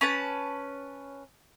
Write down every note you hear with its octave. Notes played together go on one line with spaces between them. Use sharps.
C#4 B4 A5